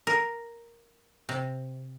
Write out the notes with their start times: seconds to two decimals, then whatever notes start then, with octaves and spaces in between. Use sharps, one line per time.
0.07 A#4
1.29 C3